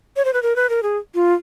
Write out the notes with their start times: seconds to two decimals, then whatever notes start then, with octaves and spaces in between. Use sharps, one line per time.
0.16 C#5
0.25 C5
0.33 B4
0.43 A#4
0.56 B4
0.69 A#4
0.83 G#4
1.15 F4